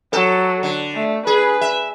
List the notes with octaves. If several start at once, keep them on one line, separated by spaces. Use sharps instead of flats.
F#3 A4
D3
A3
G#4 B4
E5